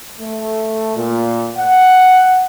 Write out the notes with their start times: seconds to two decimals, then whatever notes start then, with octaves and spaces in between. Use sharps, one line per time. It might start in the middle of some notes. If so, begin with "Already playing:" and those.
0.21 A3
0.96 A#2
1.57 F#5